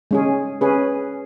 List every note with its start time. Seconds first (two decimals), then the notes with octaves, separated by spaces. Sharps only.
0.11 G#3 C#4 G#4
0.61 C#4 G#4 B4